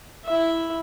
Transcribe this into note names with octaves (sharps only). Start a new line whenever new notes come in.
E4 E5